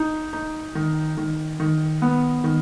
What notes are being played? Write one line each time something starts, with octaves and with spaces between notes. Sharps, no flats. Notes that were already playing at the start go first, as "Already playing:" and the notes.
Already playing: D#4
D#4
D#3
D#3
D#3
B3
D#3